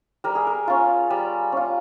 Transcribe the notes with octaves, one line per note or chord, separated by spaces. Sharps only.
G3 A#4
G#4
A#4
C#4 F4
G3
C#4 F4